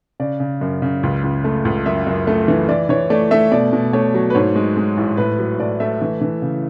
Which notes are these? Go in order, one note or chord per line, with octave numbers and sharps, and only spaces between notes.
C#3 D5
C#3
F#2
C#3
C#2
C#2
A3
C#2
F#2 E5
F#2
A3
E3
E3 D5
E3 C#5
A3 D5
A3 E5
B2 D5
B2
A3 C#5
F#3
B4
G#2 C#5
G#3
G#3
A1
A2 B4
F#3 B4
A2 D5
A3 E5
E3
E3
C#3